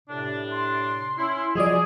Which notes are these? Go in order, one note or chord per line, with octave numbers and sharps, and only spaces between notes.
A2 C3 D4
C6
C#4 E4
F3 F#3 G#4 D5 D#5